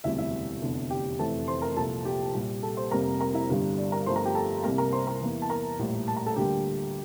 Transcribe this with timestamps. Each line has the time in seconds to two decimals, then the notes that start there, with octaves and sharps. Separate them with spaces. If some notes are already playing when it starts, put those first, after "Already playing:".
0.04 E1 D2 C3 G3 E4 E5
0.18 E4 E5
0.61 F1 E2 D3
0.90 G4 G5
1.19 F1 F2 E3 A3 A4 A5
1.48 C5 C6
1.62 A#4 A#5
1.76 C2 A#2 F3 A4 A5
2.05 G4 G5
2.34 A#1 A#2 G3
2.63 A4 A5
2.77 C5 C6
2.91 F1 F2 C3 G3 A#3 A#4 A#5
3.20 A#4 A#5
3.34 E4 E5
3.49 G1 G2 D3 G3
3.77 D5
3.92 A#4 A#5
4.06 G1 G2 F3 A3 C5 C6
4.16 A#4 A#5
4.25 G4 G5
4.35 A4 A5
4.64 C2 C3 G3 A#3 A#4 A#5
4.78 A#4 A#5
4.92 C5 C6
5.07 A#4 A#5
5.21 E2 E3 A#3
5.42 A5
5.50 A#4 A#5
5.79 A#1 A2 G3
6.08 A5
6.16 A#5
6.26 A4 A5
6.36 D2 D3 G3 A#3 G4 G5